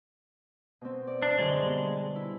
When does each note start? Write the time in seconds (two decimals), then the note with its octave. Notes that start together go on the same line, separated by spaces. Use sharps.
0.81 B2 C4
1.07 D5
1.22 D4
1.39 F#2 D3 G#3
1.62 G3 B3
2.16 E4